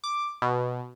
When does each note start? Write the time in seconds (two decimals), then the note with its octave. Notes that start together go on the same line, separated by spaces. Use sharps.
0.04 D6
0.42 B2